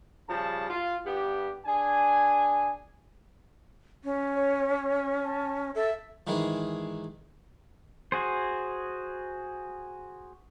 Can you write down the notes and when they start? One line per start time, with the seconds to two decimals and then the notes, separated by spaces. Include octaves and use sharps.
0.29 C#3 F3 G3 A5
0.70 F4
1.06 G2 B3 G4
1.66 D4 G#4 G#5
4.04 C#4
4.35 C#5
5.24 A5
5.75 A4 E5
6.27 G#2 D#3 E3 G#3
8.12 F#4 G#4 C5